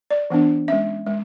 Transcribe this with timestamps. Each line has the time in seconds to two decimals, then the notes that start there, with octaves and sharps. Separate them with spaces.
0.10 D5
0.30 E3 B3 D4
0.68 G#3 C#4 E5
1.06 G#3